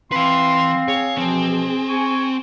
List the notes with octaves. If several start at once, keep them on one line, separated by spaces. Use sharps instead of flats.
E3 C4 B4 F5 C6
G#4 C#5
B2 E3 F3 C4
G#5 C#6